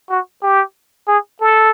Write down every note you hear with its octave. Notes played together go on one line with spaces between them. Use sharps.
F#4
G4
G#4
A4